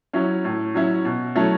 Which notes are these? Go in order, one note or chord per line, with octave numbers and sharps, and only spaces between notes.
F#3 C#4 E4
A2
F#3 C#4 E4
B2
F#3 A3 C#4 E4